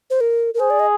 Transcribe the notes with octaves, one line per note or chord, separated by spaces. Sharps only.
C5
A#4
A#4
G#4 C5
D5
D#5